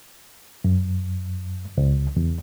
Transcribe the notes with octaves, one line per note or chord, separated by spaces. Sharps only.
F#2
C#2
E2